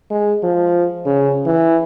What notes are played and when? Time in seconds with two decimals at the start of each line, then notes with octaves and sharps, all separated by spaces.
0.11 G#3
0.43 F3
1.06 C#3
1.46 E3